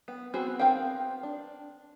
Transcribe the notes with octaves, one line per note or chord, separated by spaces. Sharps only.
B3
B3 C4 F#4 G#4
B3 C4 A#4 F5 G5
D4